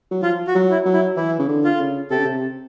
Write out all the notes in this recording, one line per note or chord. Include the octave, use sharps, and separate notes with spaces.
F#3
F3 F4
F#4
F#3
E4
F#3
E4
E3 E4
C#3
D3
F4
C#3
C3 G4 A4
C#3
C3